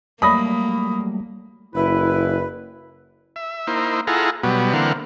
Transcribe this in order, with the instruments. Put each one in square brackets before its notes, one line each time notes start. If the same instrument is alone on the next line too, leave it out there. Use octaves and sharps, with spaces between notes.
[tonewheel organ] F#3 G3 A3 [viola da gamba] A#3 [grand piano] B5 D#6 A#6
[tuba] F#1 [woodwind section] E4 B4
[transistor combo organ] E5
A#3 D#4 E4 C5
E4 F4 G#4 A4 F#5 A#5
B2 F#3 G3 B3
D3 E3 A#3 C4 F5 F#5